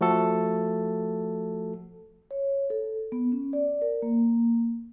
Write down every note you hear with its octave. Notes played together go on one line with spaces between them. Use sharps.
F3 A3 F#4 A4
C#5
A4
B3
C#4
D5
A#4
A#3